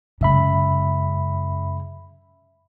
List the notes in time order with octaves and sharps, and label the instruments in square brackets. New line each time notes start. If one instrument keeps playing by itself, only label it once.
[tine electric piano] F#2 E5 B5 [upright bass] C#3 G#3